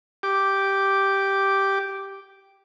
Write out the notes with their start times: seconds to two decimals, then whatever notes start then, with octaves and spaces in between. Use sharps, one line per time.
0.23 G4 D6